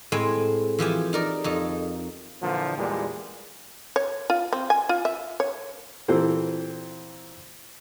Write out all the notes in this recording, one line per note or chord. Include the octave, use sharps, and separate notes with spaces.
A2 G#3 C4 G#5
E3 F3 G4 G#5
D#4 A#4 D5
F2 D#4
A#2 D3 E3 F3
E2 A#2 G3 G#3
C#5
F4
C4
G#5
F4
E5
C#5
A#2 E3 C4 G4 A4 C5